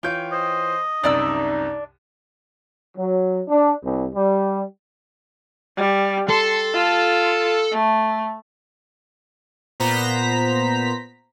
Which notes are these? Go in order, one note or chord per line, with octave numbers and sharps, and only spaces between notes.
E3 F4 C#5 G5 G6
C5 D#5
C2 F#2 C3 D4 D#4 D5 E6
F#3
D4
C2
G3
G3
A4 C6
F4
A3
A#2 B3 C5 A#5 B6